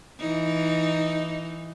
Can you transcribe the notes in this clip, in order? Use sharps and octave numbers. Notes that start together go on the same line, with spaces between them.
E3 D#4